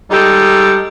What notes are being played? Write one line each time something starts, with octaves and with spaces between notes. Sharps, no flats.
G3 G#3 D#4 G4 A4